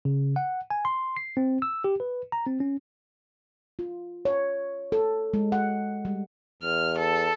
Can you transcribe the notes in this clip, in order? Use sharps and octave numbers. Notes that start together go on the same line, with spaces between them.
C#3
F#5
G#5
C6
C7
C4
E6
G4
B4
A#5
C4
C#4
F4
C#5
A4
G#3
F#5
G3
E2 F6
A4